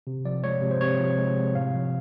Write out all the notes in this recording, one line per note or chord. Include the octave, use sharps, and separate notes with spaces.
C3
F3 D5
G#3 C#5
C3
C5
C3 C#5
F3
G#3
C3
A2 F5
F3